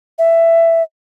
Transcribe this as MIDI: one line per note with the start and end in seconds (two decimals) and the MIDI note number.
0.19 0.83 76